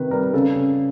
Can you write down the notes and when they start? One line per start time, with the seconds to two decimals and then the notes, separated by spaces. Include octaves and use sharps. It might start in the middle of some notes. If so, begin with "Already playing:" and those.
Already playing: C3 D#3 B4
0.11 G3 A#4
0.33 C#3 A4
0.56 C#3